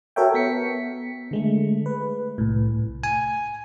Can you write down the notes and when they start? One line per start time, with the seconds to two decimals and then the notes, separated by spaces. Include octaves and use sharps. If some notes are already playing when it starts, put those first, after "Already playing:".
0.16 F#4 A4 A#4 C#5 E5 G5
0.34 B3 B6 C#7
1.31 D3 G#3 A3
1.86 B4
2.38 C2 A2
3.04 G#5